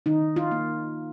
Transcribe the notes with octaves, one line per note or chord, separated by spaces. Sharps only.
D#3 D#4
F4
A#3